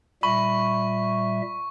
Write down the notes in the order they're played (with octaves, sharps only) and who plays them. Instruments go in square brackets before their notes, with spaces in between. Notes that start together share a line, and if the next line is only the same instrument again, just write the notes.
[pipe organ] A#2 G3 E5 [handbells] B5 [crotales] C#6